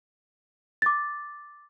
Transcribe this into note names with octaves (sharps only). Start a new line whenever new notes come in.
D6 A6